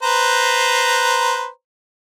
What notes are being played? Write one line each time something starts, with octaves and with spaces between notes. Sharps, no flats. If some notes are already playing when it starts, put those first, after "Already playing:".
B4 C5 A#5